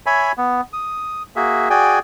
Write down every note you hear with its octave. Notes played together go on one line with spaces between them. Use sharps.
C#5 E5 G#5 B5
B3
D#6
A#3 F#4 G#4 E5
F#4 G#4 D5 G5 G#5